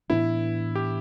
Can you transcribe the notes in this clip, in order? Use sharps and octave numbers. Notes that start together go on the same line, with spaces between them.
A2 E3 B3 D4 E4
G4